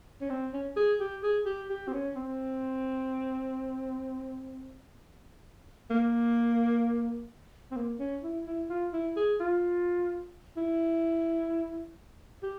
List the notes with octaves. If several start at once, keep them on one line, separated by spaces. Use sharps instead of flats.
C#4
C4
C#4
G#4
G4
G#4
G4
G4
C4
C#4
C4
A#3
C4
A#3
C#4
E4
E4
F4
E4
G#4
F4
E4
G4